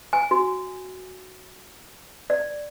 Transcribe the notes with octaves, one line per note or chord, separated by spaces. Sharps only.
G#5
F#4
D5